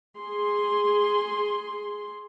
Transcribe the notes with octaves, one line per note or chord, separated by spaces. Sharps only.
G#4 C6